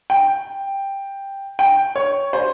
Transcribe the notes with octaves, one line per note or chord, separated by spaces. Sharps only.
G5
G5
C#5
C5